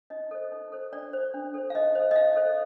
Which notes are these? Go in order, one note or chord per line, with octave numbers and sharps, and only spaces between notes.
D#4 D#5
A4 C5
D#4
A4 C5
D4 D5
A4 C5
D4
A4 C5
F5
D#4 D#5
A4 C5
D#5
D#4 F5
A4 C5